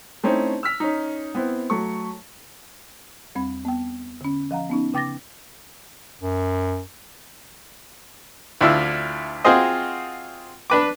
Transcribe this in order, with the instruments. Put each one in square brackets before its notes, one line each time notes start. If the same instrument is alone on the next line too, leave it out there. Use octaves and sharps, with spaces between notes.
[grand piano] A3 C4 C#4 D#4 E4
E6 F6 B6
C#4 D#4
B3 C4 E4
F#3 A3 C#6
[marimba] E2 G3 C4 B5
B3 G5
D3 C#4
F3 F5 F#5 A#5
B3 C#4 D#4
C#3 G5 D6 A6 A#6
[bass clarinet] F#2
[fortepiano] D2 D4 E4 F4 E6
C4 F4 F#4 G#4 C5 D#5
D4 B4 D6